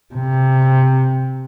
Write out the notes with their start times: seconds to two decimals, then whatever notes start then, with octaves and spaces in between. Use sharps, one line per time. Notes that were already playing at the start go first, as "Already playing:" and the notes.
0.15 C3